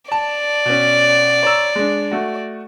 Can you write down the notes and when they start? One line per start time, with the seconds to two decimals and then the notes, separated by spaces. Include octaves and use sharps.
0.12 D5 A5
0.65 B2 C#4
1.43 C#5 A#5 E6
1.76 G#3 D4
2.11 A3 F#4